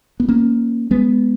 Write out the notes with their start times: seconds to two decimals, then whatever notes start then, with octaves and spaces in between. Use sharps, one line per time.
0.20 B3
0.28 A#3 C#4
0.91 G#3 B3